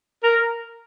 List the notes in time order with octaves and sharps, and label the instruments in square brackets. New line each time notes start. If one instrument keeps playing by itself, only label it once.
[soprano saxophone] A#4